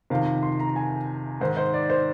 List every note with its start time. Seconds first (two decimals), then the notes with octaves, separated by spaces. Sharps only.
0.10 F2 C3 D#3 F5
0.43 C6
0.59 A#5
0.76 G#5
1.41 G#2 D#3 C5
1.57 C5
1.73 D5
1.90 C5